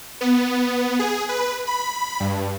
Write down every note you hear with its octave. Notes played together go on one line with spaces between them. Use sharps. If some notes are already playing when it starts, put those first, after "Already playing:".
B3
G#4
B4
B5
G2